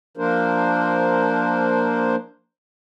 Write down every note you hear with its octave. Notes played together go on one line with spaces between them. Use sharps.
F3 A#3 D4 A#4 C5